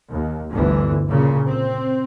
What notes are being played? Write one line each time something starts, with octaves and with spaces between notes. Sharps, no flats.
D#2
G1 D2 D3 E3
A#2 C#3
C4